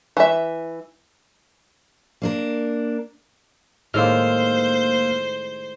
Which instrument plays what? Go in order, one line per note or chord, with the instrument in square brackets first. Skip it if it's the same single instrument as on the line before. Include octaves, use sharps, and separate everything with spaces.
[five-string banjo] E3 E5
[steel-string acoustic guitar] A#3 D4 A#4
[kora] A2 D#3 G#3 [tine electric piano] A#3 E6 F6 [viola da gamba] C5